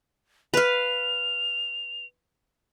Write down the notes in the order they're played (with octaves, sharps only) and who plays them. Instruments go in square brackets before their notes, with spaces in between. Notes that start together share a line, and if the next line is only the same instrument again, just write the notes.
[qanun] B4 F5 [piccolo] F7